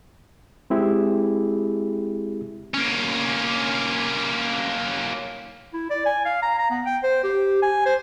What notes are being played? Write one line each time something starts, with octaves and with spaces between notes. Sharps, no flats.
G#3 C4 E4 G4 G#4
A#3 C#4
E4
D5
G#5
F5
A#5
A#5
B3
G5
C5
G4
G#5
C5